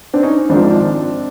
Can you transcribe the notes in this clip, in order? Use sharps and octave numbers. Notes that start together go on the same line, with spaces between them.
C4 D4
C#4 D#4
G#1 G#2 F3 C4 D4